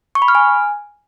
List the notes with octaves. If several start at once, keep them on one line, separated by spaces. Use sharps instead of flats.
C#6
B5
F6
G#5